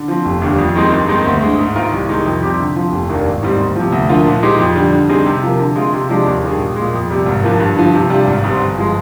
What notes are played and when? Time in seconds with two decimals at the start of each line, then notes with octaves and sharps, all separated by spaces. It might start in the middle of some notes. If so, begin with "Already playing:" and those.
Already playing: D3
0.08 F3 C4
0.25 F1
0.42 D#2 D3 G3
0.58 F2
0.75 D#3 G#3 C4 D#4
0.92 G2
1.09 D#3 G#3 C4 D#4
1.26 D2
1.42 D3 G#3
1.59 G#2
1.76 D#3 A#3 F4 A#4
1.92 C2
2.09 C3 D#3 G#3 D#4
2.26 F2
2.42 C3 G3 C4 G4
2.59 D3
2.76 F3 C4
2.92 F1
3.09 D#2 D#3 A#3 D4
3.26 G#1
3.43 G#2 D#3 G3 C4
3.59 D2
3.76 C3 F3
3.92 D2
4.09 D3 F3 A#3 F4
4.26 A#2
4.43 G#3 D#4 G4 C5
4.59 F2
4.76 D3 G3
4.93 D3
5.09 G3 C4 D#4 G#4
5.26 C3
5.43 F3 A#3
5.59 D3
5.76 G#3 C4 F4 G#4
5.92 C3
6.09 F3 G#3 D4 G4
6.26 D#2
6.43 D#3 G3 D4 G#4
6.59 A#1
6.76 A#2 G#3
6.93 F2
7.10 C3 G3
7.26 G#1
7.43 G2 F3 A#3
7.60 G2
7.76 D3 F3
7.93 C3
8.10 G3 D4 F4
8.27 G#1
8.44 G#2 G3 C4
8.60 G1
8.78 F3 G#3